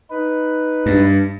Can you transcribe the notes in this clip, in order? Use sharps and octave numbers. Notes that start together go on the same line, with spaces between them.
D#4 B4
G2